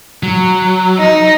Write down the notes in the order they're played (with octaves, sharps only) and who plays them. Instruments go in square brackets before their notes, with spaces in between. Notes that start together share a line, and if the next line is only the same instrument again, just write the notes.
[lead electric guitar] F#3
[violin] D#4